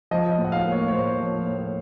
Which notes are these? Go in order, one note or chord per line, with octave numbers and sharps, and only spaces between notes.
F3 D#5
D#5
A2
F#5
F5
A#3
C#5
C#5
A2 C5
F3
A2